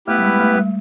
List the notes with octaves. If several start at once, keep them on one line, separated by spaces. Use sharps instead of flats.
A3 B3 E4 G4 B4
G3
G#3
A3
G3